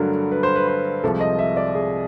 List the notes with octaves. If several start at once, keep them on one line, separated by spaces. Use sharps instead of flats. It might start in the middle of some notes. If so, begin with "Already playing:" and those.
Already playing: G2 D3 F#3 A3 A#4
B4
C5
B4
C5
C2 C3 F3 G#3 A4
D#5
E5
D5
G#4